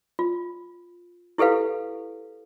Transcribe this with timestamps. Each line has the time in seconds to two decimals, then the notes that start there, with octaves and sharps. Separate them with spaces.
0.19 F4
1.38 E4 G4 A4 B4 F5